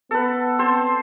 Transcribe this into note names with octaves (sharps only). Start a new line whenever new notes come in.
B3 A4 B4
C4 C5 A5